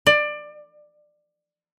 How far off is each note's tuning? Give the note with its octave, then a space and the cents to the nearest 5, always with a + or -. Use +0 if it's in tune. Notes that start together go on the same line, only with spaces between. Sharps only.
D5 +20